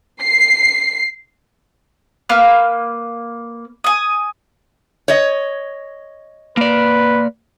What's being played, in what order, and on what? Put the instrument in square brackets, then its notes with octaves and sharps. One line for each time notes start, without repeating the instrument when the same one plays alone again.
[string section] C7
[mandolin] A#3 B4 F6
G#5 D#6
[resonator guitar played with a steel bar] C#5 D#5
[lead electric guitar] A#3 D5 [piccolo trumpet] B4